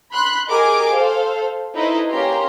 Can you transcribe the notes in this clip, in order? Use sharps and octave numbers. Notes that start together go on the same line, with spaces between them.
B5 C6 F#6
G4 G#4 A#4 D#5 G#5 D6
A4 C5 F5
D#4 E4 A4 B4 C5 D#5
A#3 C#4 G4 A#5 C6